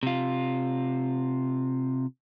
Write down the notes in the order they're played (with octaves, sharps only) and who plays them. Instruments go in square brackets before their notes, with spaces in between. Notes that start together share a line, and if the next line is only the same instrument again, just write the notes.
[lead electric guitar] C3 F4